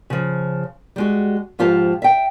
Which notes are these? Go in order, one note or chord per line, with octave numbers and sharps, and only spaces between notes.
C#3 F3
G3 G#3 F#4
G#2 F3 F4 G4 A5
E5 G5